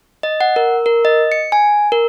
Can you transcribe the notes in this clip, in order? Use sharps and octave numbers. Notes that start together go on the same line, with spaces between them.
D#5
F#5
A#4
A#4
D#5
C#7
G#5
A#4